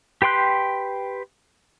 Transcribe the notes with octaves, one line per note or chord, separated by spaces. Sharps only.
G4 B4 G5 C6 F#6